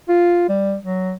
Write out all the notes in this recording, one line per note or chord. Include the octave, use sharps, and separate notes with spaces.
F4
G3
F#3